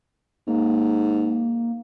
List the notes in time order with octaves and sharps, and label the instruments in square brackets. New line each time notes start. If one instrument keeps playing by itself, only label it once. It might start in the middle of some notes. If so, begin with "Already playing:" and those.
[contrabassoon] G#2 [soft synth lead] A#3